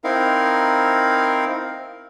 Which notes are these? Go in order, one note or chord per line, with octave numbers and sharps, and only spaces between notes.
C4 D#4 E4 A#4 F5